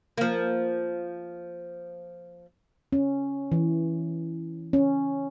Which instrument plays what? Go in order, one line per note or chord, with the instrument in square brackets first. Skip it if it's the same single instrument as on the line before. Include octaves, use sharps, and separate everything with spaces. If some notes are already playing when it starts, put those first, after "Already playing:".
[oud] F3 A#3
[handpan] C#4
E3
C#4